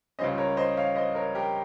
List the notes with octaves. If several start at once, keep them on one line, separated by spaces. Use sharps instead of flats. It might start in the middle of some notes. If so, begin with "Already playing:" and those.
C#2 C#3 G3 C#4 C5 D#5
A#4 C#5
C5 D#5
C#5 F5
C5 D#5
A#4 C#5
G4 A#4